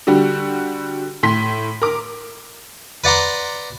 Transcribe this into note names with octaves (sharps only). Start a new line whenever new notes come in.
D3 G3 F#4 G4
A2 C6 B6
A#4 D6
B4 D5 F#5 A#5 C6